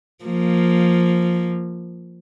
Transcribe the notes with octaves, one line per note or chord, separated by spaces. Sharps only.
F3 A#3